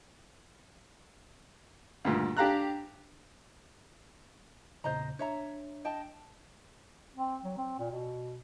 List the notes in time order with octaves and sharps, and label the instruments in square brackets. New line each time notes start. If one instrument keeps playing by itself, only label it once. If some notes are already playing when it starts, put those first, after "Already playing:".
[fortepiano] D2 G2 A#2
D4 G4 F5 A#5 F#6
[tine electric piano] E2 A#2 C#3 [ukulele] C5 D#5 A#5
[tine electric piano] D4 [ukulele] C#5 E5 A#5
[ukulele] D#5 G5 A5
[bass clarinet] C4
F#3
C4
A#2
B2